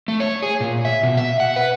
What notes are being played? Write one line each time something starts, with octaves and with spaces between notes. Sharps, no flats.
A3
C#5
G#4
A#2
E5
B2
E5
F#5
B4